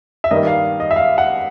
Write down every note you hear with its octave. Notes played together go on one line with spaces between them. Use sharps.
E5
G2 D#3 G3 A#3 D#5
F5
D#5
E5
F5
F#5